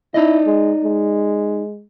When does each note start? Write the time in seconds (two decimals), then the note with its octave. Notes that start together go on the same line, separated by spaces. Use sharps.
0.14 D#4 E4 D5 D#5
0.46 G#3
0.84 G#3